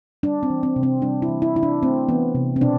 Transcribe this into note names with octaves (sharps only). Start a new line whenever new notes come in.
G3 D4
C4
E3
C4
C3
C4
G3 D4
E4
E3
E4
C3 E4
D4
A3 C4
E3 B3
C3
C4
B2 D4